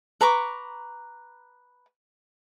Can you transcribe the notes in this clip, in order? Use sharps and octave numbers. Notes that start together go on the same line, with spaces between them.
B4 A#5 C#6 D6